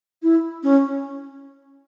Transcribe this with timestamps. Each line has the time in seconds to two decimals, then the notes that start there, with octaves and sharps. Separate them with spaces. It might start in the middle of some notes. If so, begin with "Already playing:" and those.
0.23 E4
0.63 C#4